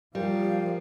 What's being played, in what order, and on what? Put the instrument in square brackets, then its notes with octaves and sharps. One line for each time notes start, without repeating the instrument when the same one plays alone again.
[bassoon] A#2 [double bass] F3 [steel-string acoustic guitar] G3 [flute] F5